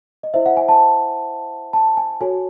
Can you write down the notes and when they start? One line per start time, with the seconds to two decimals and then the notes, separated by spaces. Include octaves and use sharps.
0.23 D#5
0.34 E4 C5 E5
0.46 F#5
0.57 G#5
0.69 A5
1.73 A5
1.97 G#5
2.21 F#4 A4 C#5 G#5